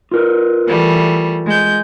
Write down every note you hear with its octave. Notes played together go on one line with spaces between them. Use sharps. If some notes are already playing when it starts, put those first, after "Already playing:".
F4 A#4 B4
E3 G3 A3
G#3 G6